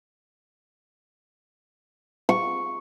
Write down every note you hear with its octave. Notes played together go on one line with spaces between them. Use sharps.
C#6